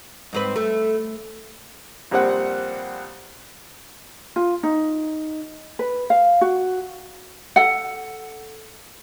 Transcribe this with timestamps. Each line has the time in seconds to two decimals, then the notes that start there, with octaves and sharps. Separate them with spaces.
0.33 G#2 C4 B4
0.56 A3
2.11 A#1 G3 C4 F#5
4.36 F4
4.63 D#4
5.79 B4
6.10 F5
6.41 F#4
7.56 A4 F#5